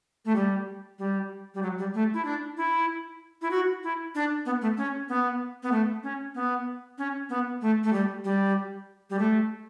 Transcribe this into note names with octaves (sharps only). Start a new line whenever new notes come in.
A3
G3
G3
G3
F#3
G3
A3
E4
D4
E4
E4
F#4
E4
D4
B3
A3
C#4
B3
B3
A3
C#4
B3
C#4
B3
A3
A3
G3
G3
G3
A3